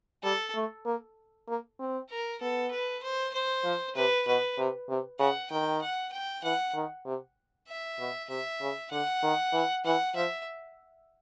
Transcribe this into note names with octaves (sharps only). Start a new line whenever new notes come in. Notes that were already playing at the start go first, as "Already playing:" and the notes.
G3 A4
A3
A#3
A#3
C4
A#4
B3 A4
B4
C5
C5
F3
C3 B4
B2 B4
C3
C3
C#3 F#5
D#3 G5
F#5
G5
E3 F#5
D#3
C3
E5
B2
C3 E5
C#3
D3 F#5
D#3
E3
E3 F#5
F3 E5